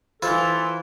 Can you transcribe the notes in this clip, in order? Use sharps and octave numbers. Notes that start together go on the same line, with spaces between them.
E3 E4 F4 A4 C5 C6